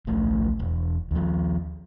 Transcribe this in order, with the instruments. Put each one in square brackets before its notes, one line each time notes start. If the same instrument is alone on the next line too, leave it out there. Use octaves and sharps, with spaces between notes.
[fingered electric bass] D1 A#1 A3
E1
D#2 F3